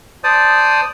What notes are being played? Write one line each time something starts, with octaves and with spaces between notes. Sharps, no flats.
C5 D5 A5 D#6